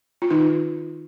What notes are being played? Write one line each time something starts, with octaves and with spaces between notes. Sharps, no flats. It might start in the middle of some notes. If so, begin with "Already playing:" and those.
F4
D#3 D#4